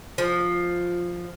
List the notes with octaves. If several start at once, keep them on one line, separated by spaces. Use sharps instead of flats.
F3